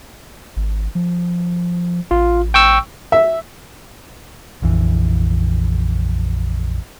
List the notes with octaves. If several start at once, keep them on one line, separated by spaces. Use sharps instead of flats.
G#1
F3
A1 F4
G5 C#6 E6
E5
A#1 F2 E3